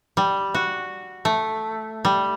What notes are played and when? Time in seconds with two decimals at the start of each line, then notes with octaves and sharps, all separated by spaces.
0.17 G3
0.55 F#4
1.25 A3
2.05 G3